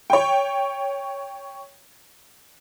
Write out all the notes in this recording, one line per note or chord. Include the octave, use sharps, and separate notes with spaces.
C#5 G5